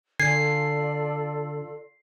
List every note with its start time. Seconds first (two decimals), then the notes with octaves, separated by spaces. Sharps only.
0.20 D3 F4 A4 D5 G#5 C7